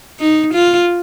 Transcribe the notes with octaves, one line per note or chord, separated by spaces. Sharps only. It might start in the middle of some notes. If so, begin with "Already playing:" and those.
D#4
F4